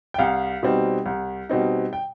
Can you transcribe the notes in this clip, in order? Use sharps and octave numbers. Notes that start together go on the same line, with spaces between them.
G5
C2 F5
B2 G3 C4 D#4
C2
B2 G3 C4 D#4
G5